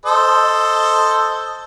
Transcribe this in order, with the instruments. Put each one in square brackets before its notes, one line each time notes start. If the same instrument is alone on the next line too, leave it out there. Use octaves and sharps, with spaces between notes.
[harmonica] A4 C5 D#5